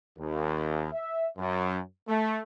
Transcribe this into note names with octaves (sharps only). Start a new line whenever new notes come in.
D#2
E5
F#2
A3